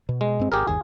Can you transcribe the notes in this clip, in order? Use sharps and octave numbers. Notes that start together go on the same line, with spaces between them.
B2
G#3
G2 C4
G#1 G4 G#4 A#4
G1 D#2 G#4